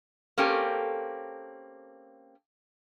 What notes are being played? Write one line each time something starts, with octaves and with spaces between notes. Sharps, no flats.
A#3 C4 C#4 G4 A4 G#5